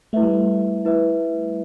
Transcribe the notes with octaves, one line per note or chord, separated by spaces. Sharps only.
A3 E4 B4 E5
G3
A3
E4 B4 E5